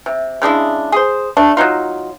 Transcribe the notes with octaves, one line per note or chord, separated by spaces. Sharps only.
C3
C#3 G#3 D4 E4
G#4 C5
A3 D4
F#3 G3 D#4 F4